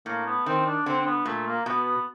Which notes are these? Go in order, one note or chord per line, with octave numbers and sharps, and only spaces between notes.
A2 A#3
B3
D#3 C4
D4
D3 C4
C4
B3
A#2 A3
A#3
B2 B3